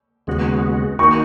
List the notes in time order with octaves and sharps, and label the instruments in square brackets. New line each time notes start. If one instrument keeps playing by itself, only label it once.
[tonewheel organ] D#2 C#3 G#3 B3 F#4
[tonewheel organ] D#3 A#3 D#4 F#4 [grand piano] C#6